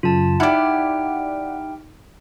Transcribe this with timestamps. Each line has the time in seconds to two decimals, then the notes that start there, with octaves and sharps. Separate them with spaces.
0.03 F#2 C#3 F4 A5
0.40 D#4 E4 G4 D5 F#5 F6